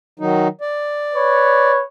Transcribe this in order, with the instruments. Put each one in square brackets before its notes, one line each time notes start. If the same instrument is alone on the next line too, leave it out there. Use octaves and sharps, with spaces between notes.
[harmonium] D#3 F#3 D#4
D5
[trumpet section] B4 C#5